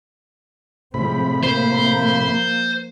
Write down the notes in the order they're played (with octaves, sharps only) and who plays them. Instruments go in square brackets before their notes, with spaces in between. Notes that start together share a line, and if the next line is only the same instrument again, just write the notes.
[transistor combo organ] A2 C3 B5 [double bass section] F3 G#3 C4
[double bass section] F3 A#3 [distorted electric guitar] C5